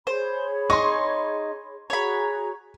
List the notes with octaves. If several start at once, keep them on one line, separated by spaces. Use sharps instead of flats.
G#4 C5 C#5 B5
D#4 C6 C#6
F#4 G#4 C#5 A#5 B5